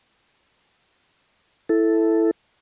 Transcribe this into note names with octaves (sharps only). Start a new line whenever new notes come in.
E4 A4